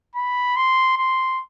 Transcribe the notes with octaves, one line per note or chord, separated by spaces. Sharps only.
B5
C6
C6